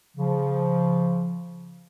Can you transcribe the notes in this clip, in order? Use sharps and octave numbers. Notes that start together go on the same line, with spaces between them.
C#3 F3